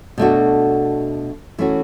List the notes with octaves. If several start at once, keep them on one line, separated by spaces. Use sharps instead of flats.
B2 A3 D4 F#4
E3 A3 C#4 F#4